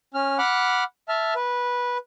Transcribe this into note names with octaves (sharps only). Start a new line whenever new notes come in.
C#4 F6
F#5 B5 D6 F6 F#6
E5 A5 F6
B4